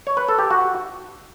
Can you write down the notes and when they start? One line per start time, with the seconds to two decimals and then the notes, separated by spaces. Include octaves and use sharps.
0.07 C#5
0.17 B4
0.28 A4
0.39 G4
0.51 F#4